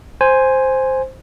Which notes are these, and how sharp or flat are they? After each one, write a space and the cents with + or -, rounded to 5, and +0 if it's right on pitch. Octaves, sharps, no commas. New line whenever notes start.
C5 +0 G#5 +0